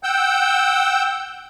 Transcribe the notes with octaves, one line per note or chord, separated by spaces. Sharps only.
F#5 G5 E6 G6